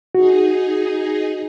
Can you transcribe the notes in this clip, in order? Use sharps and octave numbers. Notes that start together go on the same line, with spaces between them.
D#4 F#4 G#4